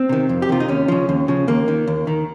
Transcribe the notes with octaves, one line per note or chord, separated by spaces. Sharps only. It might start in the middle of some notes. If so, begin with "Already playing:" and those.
Already playing: C4
C3 D#3
F2
G4
C3 D#3 F4
D#4
D#2 C#4
C#3 F3
D#2
C#3 F3
D#2 A#3
D#3
D#2
D#3